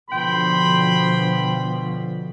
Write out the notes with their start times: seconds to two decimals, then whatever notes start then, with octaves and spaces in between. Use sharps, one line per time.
0.10 B2 D3 F3 G5 B5 C6